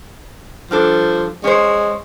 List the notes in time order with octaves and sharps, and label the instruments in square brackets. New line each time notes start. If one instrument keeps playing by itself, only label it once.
[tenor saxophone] F3 [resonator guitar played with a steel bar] G3 D4 A4
[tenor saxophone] G#3 [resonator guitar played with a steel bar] C#4 C5